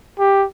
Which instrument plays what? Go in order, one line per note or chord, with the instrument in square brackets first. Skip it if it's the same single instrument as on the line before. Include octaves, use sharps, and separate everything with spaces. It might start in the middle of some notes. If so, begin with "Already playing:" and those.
[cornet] G4